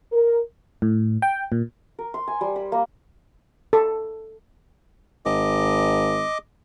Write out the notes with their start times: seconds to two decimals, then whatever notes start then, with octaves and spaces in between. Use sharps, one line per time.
0.13 A#4
0.82 A2
1.22 G5
1.52 A#2
1.99 A#4
2.14 C6
2.27 G#5
2.41 G3
2.56 B5
2.72 A#3
3.73 A4
5.25 G#1 D#5 D6